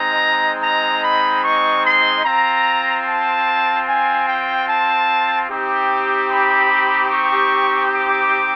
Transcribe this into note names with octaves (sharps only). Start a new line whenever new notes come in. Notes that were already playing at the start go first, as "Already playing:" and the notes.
Already playing: G#3 C4 D#4 A#5
A#5
B5
C#6
C6
C4 F4 A#5
A5
G#5
G5
A5
C4 D#4 G4
B5
C#6
D6